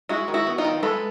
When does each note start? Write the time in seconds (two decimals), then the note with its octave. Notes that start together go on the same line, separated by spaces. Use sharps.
0.09 G#3 E4 F#4
0.28 D#3
0.34 E4 F#4
0.47 B3
0.58 D#4 F4
0.64 D#3
0.83 G#3 A4 B4